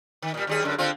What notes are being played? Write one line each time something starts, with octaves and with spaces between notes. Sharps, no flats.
D#3
A#2 G3
D#2 G3 G#4
F#2 D3
D3 C4 F4